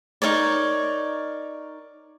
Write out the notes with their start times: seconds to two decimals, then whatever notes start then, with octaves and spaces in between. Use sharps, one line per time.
0.22 D#4 A#4 C#5 D5